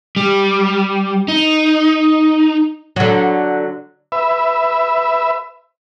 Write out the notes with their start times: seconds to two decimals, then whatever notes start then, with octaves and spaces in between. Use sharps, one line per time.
0.16 G3
1.28 D#4
2.96 D3 F#3
4.12 B4 E5